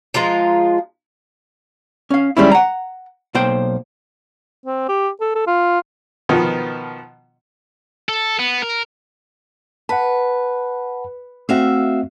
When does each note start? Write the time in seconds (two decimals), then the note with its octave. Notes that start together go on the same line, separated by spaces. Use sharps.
0.14 F3 G#3 F4 A#5
2.10 C#4 F5
2.37 D#3 G3 G#3 C#4 E4
2.52 F#5 A#5
3.35 B1 A#3 C5 G5
4.66 C4
4.89 G4
5.21 A4
5.35 A4
5.47 F4
6.29 B2 D#3 F3 B3
8.09 A4
8.39 B3
8.62 A#4
9.89 B4 F#5 A5
11.49 A3 C4 F#4 E5 F5